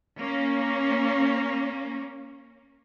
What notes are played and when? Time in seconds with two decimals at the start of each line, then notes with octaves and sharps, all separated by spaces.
0.18 A#3 C#4